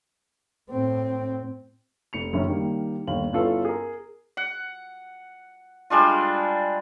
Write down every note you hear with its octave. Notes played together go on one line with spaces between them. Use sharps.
A2 C4
F1 C#7 F7
F#1 F#2 D#3 C#4 E5
D#3 G3 A#3
G1 D#2 F5 F#7
G1 C#4 E4 F4 A4 B4
G#4 A#4
F#5
G3 G#3 D4 F4